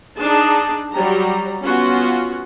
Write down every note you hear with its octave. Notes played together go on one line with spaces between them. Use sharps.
D4 D#4 G#4 A5
F#3 G3 G4 A#5
B3 C#4 F4 F#4